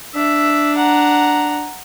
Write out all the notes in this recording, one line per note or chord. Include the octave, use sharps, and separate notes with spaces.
D4 E5
F#5 A#5